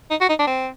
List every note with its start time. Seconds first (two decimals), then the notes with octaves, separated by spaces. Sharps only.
0.10 D#4
0.21 F#4
0.29 D#4
0.39 D4
0.47 C4